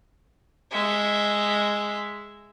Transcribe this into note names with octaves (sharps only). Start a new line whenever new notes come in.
G#3 E5